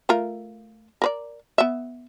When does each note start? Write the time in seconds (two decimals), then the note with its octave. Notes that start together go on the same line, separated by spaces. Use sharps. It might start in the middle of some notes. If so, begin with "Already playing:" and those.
0.09 A3 F4 A#4
1.02 A#4 B4 D5
1.58 B3 E5